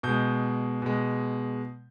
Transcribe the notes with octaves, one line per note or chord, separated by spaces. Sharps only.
B2 G#3 G6
B2 G#3